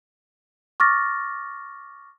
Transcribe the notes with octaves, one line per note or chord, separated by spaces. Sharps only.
C#6 D6 F6 A6 A#6